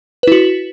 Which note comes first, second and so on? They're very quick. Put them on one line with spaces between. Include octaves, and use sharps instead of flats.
B4 E4 F#4